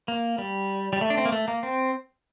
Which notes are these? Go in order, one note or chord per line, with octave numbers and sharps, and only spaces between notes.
A#3
G3
G3
A3
D4
C4
A#3
A3
A#3
C4